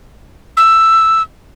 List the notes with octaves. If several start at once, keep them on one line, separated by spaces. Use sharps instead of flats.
E6